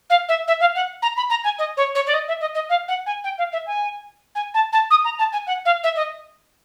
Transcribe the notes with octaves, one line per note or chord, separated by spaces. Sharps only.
F5
E5
E5
F5
F#5
A#5
B5
A#5
G#5
D#5
C#5
C#5
D5
D#5
E5
D#5
D#5
F5
F#5
G#5
G5
F5
E5
G#5
G#5
A5
A5
D#6
A#5
A5
G#5
F#5
F5
E5
D#5